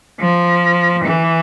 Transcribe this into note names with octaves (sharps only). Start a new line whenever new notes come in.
F3
E3